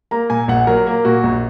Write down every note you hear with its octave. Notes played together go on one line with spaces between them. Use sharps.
A#3 A#5
A#2 G#5
A#1 F#5
F#3 A#4
A#3
A#2 F#4
A#1